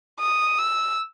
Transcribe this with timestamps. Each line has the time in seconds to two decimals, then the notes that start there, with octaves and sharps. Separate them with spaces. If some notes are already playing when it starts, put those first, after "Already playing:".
0.20 D#6
0.59 E6